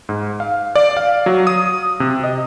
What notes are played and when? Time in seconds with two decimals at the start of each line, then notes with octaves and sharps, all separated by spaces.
0.09 G#2
0.40 F5
0.76 D5
0.97 F5
1.26 F#3
1.47 D#6
2.00 C3
2.24 D#5